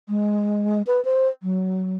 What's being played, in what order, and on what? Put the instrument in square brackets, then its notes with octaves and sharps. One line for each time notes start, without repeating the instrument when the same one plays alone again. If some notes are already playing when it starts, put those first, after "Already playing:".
[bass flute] G#3
B4
C5
F#3